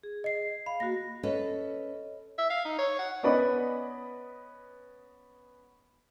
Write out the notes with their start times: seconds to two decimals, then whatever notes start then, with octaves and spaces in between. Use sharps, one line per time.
0.03 G#4
0.24 D#5 C7
0.66 F5 B5
0.80 A#3 F#4 A#6
1.23 C#4 A4 B4 C#5 D#5
2.38 E5
2.50 F5
2.65 D#4
2.79 C#5
2.99 F#5
3.23 B3 C#4 B4 D5 D#5 B5